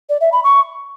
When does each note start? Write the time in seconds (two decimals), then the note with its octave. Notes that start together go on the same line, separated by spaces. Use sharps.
0.09 D5
0.21 E5
0.32 B5
0.44 C#6